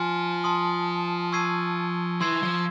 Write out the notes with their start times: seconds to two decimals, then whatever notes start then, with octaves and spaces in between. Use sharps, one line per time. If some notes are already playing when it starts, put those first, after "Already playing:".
Already playing: F3 G#5 C6 F6
0.44 A5 C6 D#6
1.32 C#6 E6 G#6 C7 D#7
2.21 E3 C6 E6 G#6 C7
2.43 F3